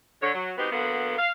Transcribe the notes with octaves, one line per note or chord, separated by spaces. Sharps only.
D3 C#5
F#3
G#3 B3 C4 D#4 F#4 G4
D3 F#3 A#3 B3
F5